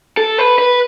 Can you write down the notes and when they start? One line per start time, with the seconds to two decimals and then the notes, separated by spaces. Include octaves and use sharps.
0.17 A4
0.38 B4
0.59 B4